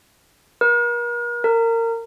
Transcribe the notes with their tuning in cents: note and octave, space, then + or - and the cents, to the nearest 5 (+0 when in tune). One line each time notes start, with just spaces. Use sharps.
A#4 +40
A#4 -25